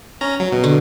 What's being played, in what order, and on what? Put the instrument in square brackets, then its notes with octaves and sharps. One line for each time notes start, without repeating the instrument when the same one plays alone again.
[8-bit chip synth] C#4 A#5
F#3
B2
[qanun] D3